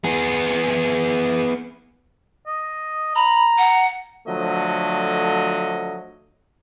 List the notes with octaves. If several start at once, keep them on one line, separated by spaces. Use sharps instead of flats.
B3 G#4
D#5
A#5 B5
F#5
D3 F3 F#3 A3 D#5